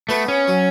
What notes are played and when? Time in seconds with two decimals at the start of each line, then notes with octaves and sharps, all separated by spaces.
0.09 A3 B3 F#4 B4
0.28 C#4
0.48 F#3